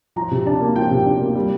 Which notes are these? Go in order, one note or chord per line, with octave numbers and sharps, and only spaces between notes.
F3 A#5
C3
D4 A5
A#3
F3 G5
C3
D4
A#3
G3